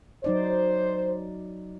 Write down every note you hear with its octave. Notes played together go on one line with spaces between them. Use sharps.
F#3 D#4 C5 D5